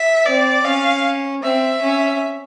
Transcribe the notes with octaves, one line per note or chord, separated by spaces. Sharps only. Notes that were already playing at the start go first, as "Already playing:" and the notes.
Already playing: E5
C4 D5
C#4 F5
C4 E5
C#4